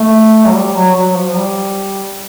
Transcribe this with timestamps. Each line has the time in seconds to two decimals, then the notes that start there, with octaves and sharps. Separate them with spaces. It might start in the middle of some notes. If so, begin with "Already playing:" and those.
Already playing: A3
0.45 F#3
0.52 G3
0.74 F#3
0.95 F#3
1.15 F3
1.36 G3